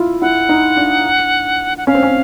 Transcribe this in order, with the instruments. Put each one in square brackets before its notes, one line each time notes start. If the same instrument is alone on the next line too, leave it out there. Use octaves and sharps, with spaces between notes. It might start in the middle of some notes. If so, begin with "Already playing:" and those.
Already playing: [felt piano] E4 F4
[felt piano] E4 [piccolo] F#5
[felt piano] D#4
D4
[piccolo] F#5
[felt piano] C#4 [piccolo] F5
[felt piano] C4
C#4